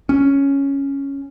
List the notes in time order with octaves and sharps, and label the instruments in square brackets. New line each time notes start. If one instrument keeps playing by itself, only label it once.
[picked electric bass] C#4